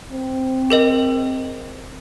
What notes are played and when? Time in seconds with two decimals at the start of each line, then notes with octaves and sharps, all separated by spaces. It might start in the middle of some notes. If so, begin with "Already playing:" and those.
0.12 C4
0.70 G#4 A#4 D#5